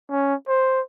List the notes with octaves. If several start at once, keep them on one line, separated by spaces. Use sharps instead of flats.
C#4
C5